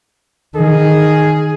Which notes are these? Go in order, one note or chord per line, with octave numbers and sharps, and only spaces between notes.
D#3 G#4